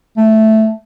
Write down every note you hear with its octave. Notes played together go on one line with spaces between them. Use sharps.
A3